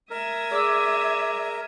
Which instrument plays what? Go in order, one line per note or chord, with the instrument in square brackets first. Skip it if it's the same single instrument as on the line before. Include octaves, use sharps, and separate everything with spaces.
[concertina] A#4 [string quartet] E5 D#6 G#6
[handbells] G#4 D6 E6 [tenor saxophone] D5